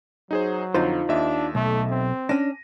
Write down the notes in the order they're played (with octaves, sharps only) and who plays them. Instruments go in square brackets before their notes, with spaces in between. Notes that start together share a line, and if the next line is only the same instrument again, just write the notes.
[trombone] F#3 [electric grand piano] D#4 G#4 C5
[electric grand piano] F2 D3 [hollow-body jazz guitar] D#4 F4 C5
[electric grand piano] D#2 D#5 E5 [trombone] D4
[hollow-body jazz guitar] B1 [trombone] A3
[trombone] C4
[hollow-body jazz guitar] C#4 D4 [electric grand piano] A#6 D#7